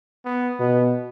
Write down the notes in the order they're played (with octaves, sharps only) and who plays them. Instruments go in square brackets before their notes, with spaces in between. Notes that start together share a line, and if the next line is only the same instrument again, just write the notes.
[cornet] B3
[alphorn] B2 [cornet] B3